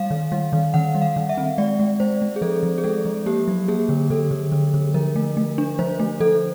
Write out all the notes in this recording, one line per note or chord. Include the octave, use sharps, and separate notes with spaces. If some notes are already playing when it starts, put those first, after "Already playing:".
Already playing: G3 F5
D#3
G3
D#3
D#3 F#5
G3
F5
D#3
E5
C4
G#3 D5
G#3
G#3 C5
G#3
G#4
F3 A4
F3
G#4
G#3 A4
F3
A#3 G4
F#3
A#3 G#4
D3
D3 A4
D3
D3
D3
F3 A#4
A3
A3
D4
F3 C5
A3
F3 A4